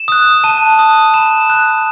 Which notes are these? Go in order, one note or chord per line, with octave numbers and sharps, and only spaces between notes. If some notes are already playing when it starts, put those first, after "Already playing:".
Already playing: E7
D#6 F#6
A5 D#7
D#6 F#6
B5 E7
F#6